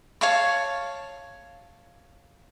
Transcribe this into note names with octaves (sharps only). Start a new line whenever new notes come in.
C#5 F5 A5 C#6